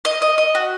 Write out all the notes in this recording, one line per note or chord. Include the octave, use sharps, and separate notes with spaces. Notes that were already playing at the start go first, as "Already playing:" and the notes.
D#5
D#5
D#5
F#4